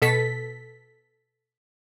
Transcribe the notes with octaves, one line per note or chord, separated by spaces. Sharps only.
B2 A4 B6